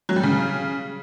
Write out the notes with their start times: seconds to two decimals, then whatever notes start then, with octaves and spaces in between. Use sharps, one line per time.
0.09 F#3
0.16 G3
0.23 C#3